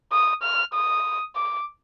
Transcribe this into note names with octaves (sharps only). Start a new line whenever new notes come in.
D#6
F6
D#6
D6